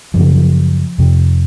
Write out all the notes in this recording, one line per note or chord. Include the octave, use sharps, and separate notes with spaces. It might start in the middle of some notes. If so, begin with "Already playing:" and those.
F#2 C#3 F3
F3
F2 C3